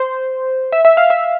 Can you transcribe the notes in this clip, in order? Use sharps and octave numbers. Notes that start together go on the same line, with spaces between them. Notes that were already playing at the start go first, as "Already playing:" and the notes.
Already playing: C5
E5
E5
F5
E5